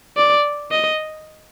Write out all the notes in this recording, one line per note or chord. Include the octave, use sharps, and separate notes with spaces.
D5
D#5